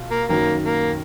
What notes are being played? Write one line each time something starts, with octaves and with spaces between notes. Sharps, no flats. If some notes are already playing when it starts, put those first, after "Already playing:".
Already playing: B2 F4
A#3
F#2 D#3 F#3 A#3
A#3